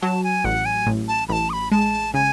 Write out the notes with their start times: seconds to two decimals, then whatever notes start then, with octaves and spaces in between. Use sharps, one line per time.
0.02 F#3 A5
0.24 G#5
0.44 A1 F#5
0.66 G#5
0.86 A1
1.08 A5
1.28 A1 A5 B5
1.50 D#6
1.53 B5
1.71 G#3 A5
2.14 C#3 G#5